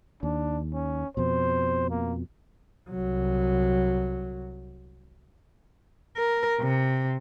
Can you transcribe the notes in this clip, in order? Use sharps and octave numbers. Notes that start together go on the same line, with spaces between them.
D#2 D4
C#4
F2 B2 C5
A#3
C2 F#3
A#4
C3